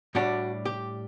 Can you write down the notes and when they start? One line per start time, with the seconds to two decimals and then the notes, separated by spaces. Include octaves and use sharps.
0.15 A2 G3 D4 F#4
0.65 G4